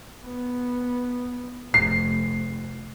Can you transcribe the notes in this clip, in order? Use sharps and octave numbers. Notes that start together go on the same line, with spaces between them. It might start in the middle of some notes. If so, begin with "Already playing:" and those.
B3
F1 C7